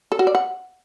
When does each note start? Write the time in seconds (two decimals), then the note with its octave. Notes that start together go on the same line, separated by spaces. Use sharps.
0.12 A4
0.19 F#4
0.27 D5
0.35 F#5